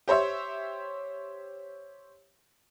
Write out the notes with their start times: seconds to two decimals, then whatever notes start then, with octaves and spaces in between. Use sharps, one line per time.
0.08 G4 C5 C#5 E5